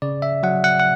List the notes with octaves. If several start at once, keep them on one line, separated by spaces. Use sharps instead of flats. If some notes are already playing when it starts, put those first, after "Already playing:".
C#3 D5
E5
F#3 F#5
F#5
F#5